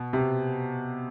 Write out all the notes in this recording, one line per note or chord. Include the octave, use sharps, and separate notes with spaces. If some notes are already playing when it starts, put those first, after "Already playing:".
Already playing: B2
C3